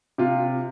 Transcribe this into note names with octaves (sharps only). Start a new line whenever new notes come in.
C3 F4